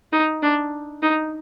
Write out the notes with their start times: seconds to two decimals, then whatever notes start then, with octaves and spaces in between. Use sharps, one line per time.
0.12 D#4
0.42 D4
1.02 D#4